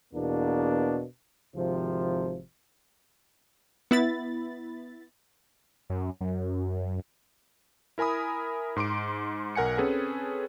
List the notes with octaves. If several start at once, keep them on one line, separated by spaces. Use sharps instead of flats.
E2 B2 A#3 D4
G#1 C3 F3
B3 E4 B5 A6
F#2
F#2
E4 A#4 G#5 B5 D#6
G#2 C6 D6 D7
B1 A#4 F#5 G#5 C#7
C4 C#4 G#4 A4 B4